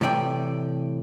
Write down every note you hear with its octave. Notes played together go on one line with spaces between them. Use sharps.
A2 C3 E3 D5 G5 G#5